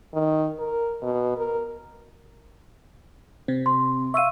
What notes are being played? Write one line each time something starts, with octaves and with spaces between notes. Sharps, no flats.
D#3
A#4
B2
A#4
C3 C4
C6
E5 F5 C#6 E6 D#7